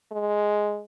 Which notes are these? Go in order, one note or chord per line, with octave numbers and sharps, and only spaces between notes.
G#3